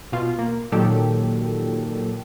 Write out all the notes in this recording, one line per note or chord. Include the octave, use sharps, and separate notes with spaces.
B2 F4
A#3
A#2 D#3 F#3 G4 A4